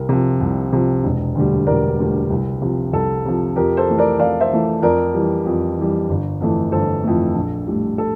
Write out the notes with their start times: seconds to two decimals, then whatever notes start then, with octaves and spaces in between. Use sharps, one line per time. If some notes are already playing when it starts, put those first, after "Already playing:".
Already playing: C2 A#4
0.09 C3 F3
0.41 C2
0.73 C3 F3
1.04 E1
1.35 D2 D3 G3
1.67 E1 A#4 D5
1.99 D2 D3 G3
2.30 C2
2.62 C3 F3
2.93 C2 A4
3.25 C3 F3
3.56 F2 G4 A#4
3.77 A4 C5
3.88 E3 A3
3.98 A#4 D5
4.19 F2 D5 F5
4.40 C5 E5
4.51 E3 A3
4.82 F2 A#4 D5
5.14 E3 G3
5.46 F2
5.77 E3 G3
6.09 G1
6.41 F2 E3 A3
6.72 G1 A4 C5
7.04 F2 E3 A3
7.35 A#1
7.67 A2 G3
7.98 A4